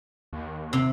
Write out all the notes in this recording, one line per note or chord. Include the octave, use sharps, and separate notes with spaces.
D#2
C3